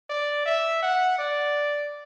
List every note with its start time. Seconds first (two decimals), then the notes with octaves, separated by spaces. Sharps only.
0.10 D5
0.45 E5
0.82 F#5
1.19 D5